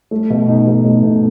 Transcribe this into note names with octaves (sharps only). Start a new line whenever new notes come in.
A3
B2
D#4
B2
A3
B2